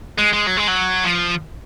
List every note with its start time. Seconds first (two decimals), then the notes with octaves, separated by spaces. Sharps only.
0.18 G#3
0.33 G#3
0.47 F#3
0.57 G#3
0.68 F#3
1.04 F3